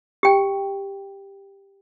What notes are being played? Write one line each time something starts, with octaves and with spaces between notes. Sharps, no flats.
G4 G5